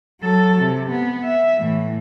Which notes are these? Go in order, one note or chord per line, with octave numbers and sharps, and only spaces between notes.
F#3 A4
C3
B3
E5
A2 E3